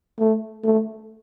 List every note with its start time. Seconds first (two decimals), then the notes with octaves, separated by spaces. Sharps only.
0.20 A3
0.64 A3